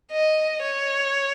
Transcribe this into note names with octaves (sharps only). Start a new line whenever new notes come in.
D#5
C#5